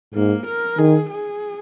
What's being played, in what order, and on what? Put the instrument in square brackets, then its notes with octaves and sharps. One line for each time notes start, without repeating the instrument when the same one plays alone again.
[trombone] G#2 [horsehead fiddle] A#3
[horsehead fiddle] A#4
[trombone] D#3 [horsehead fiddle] G#4
[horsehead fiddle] G#4